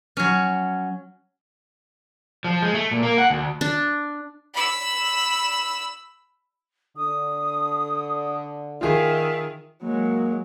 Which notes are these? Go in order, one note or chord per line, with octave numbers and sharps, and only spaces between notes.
F#3 C#4
F3
G#3
A3
A#2
A#3
F#5
D2
D4
B5 E6
D3 D#6
D#3 F4 G#4 E5
F#3 G#3 A#3